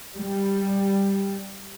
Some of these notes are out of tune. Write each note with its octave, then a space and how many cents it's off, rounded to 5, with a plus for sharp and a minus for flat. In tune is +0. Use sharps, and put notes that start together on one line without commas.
G3 +5